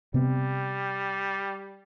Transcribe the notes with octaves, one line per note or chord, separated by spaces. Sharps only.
C3 G3 B3